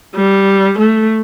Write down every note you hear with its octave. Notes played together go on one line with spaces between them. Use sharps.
G3
A3